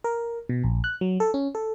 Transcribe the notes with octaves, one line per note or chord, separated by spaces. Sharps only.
A#4
B2
A#1
F#6
F#3
A4
C#4
A4